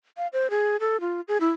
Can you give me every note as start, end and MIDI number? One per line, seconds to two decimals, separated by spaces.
0.17 0.27 77
0.33 0.47 72
0.50 0.77 68
0.80 1.00 69
1.01 1.21 65
1.28 1.38 68
1.41 1.50 64